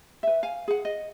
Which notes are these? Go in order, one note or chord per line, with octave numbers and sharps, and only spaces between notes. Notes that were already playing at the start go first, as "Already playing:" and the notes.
B4 E5
F5 G#5
G#4 F#5
D#5